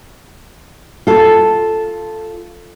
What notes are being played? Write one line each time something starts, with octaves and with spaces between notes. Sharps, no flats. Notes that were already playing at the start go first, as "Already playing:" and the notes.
F4 A4